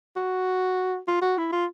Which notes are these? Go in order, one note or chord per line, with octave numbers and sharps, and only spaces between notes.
F#4
F4
F#4
E4
F4